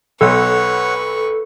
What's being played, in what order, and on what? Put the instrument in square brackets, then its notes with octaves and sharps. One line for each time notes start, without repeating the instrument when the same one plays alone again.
[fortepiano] B1 [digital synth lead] A4 [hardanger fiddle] B4 C#6 [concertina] C#5 F#5